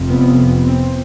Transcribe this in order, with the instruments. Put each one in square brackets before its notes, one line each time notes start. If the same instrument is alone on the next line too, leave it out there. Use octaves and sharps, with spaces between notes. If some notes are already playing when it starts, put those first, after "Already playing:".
Already playing: [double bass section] F1 F2 C3
B3
B3
C4